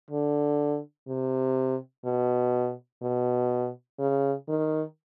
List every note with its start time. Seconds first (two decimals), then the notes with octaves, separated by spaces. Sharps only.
0.10 D3
1.08 C3
2.05 B2
3.02 B2
3.99 C#3
4.49 D#3